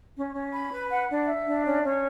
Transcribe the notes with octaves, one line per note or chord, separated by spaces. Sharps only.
C#4
C#4
B5
B4
F#5
D4
E5
D4
C#4
C#4